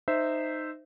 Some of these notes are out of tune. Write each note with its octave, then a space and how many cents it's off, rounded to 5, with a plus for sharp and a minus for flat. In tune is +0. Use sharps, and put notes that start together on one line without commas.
D#4 -15 C5 -10 E5 +0